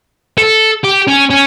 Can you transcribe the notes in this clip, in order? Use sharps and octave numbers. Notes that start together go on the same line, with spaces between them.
A4
G4
C#4
C#4